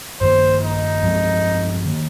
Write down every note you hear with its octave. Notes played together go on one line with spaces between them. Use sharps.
G2 D#3 A#3 C5
D#4
G2 F3 G#3 C4
D#3 A#3